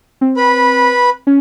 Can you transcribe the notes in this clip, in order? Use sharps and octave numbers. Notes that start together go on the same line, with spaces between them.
C4
B4 B5
C#4